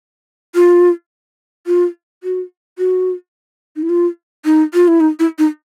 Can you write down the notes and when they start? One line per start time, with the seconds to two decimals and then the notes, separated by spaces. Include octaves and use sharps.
0.55 F4
1.67 F4
2.23 F#4
2.78 F#4
3.76 D#4
3.83 E4
3.89 F4
4.45 D#4
4.74 F4
4.88 E4
5.00 D#4
5.19 E4
5.39 D#4